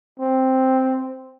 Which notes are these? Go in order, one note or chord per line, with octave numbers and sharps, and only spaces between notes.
C4